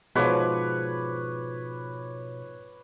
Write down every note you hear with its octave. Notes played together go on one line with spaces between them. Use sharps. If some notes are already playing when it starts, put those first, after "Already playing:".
G#2 B2 F3 B4 C#5 D6